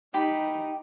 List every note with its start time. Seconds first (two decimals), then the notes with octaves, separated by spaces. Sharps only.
0.14 D#4 G4 B5